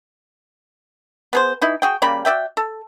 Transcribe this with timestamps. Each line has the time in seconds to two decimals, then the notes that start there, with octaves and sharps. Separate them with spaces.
1.33 B3 G#4 C5
1.61 E3 D#4 E4
1.82 F#4 G#4 G5
2.02 C#3 G3 A#3 B5
2.25 F#4 D5 E5 G5
2.57 A4